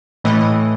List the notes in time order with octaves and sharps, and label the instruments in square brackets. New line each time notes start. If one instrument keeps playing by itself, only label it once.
[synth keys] A2 E3 A3 D#5